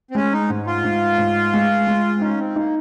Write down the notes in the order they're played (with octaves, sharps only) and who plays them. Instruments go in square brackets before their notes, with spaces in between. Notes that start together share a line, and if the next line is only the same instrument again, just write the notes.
[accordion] C4
[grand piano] G#3 [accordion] C#4
[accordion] D#4
[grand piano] G#2
[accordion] F4
[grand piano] G#2
G#2
G#3
G#3
[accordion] C4
[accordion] C#4 [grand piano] D#4
[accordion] C4
[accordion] A#3 [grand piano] D#4